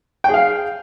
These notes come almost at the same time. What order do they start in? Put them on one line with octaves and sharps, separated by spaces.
G5 G#4 F5